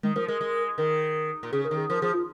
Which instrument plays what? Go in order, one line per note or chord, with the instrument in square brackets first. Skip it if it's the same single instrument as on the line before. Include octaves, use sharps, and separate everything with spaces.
[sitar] D#3 [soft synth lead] G#3
[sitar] F3 [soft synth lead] A#4
[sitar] G#3 [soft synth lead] A#4
[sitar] G#3
[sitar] D#3 [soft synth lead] A#4
[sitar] A#2
[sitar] C#3 [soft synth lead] G#4
[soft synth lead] A#4
[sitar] D#3
[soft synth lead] G#4
[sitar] F3 [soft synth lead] A#4
[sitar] F3 [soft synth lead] G#4
[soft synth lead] F4